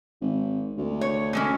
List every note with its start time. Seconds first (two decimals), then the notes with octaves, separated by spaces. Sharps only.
0.21 G#1
0.78 D2
1.01 C#5
1.33 D3 G#3 C#4